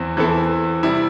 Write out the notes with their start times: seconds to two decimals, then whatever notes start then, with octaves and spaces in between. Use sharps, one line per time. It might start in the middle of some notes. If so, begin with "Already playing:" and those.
Already playing: E2 E3 C4 E4
0.16 E2 E3 C4 E4 A4
0.83 C3 G3 E4